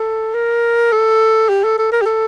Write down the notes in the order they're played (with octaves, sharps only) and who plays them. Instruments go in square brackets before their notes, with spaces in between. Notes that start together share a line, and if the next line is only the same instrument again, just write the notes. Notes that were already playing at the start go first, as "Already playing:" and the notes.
Already playing: [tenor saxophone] A4
A#4
A4
G4
A4
A4
A#4
G4
A4